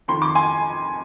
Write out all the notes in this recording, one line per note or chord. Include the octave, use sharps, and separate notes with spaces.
F2 D#3 C6
D6
G#5 C6